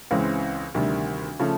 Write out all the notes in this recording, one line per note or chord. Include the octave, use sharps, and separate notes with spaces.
C#2 C#3 E3 G#3 C4
D2 C3 D#3 G3
C#3 F3 A3